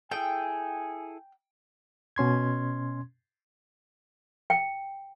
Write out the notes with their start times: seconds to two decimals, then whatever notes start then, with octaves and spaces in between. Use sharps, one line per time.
0.11 E4 G#4 A4 G5 G#5
2.16 B2 C#4 C6 G#6
4.50 G5